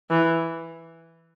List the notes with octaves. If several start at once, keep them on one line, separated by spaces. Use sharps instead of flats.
E3